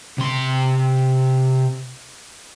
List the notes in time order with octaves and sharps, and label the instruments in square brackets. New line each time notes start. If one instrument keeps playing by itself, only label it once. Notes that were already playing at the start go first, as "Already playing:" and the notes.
[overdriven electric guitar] C3 C6